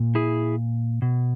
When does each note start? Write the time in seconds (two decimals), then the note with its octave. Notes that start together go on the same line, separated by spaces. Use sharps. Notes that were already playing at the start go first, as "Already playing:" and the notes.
Already playing: A#2
0.15 E4 G#4
1.02 B2